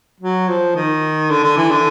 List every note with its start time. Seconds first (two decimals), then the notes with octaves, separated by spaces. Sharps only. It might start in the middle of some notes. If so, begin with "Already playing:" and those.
0.21 F#3
0.48 F3
0.75 D#3
1.30 D3
1.43 D3
1.57 E3
1.71 D3